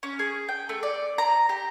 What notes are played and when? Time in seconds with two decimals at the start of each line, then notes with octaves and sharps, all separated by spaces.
0.03 C#4
0.19 G#4
0.48 G5
0.69 A3
0.83 D5
1.18 A#5
1.49 G4